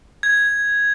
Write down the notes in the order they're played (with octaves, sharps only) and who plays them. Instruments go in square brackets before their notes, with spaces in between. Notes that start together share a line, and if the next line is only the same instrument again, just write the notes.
[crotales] G#6